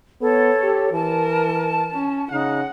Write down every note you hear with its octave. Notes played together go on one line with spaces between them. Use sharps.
B3 A4 C#5
G4
E3 A#4 A5
C#4
C#3 D#4 F#5